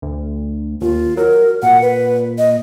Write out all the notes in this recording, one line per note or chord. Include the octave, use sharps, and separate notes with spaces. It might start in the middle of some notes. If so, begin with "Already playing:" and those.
D2
D#2 F4
F#3 A#4
A#2 F#5
B4
D#5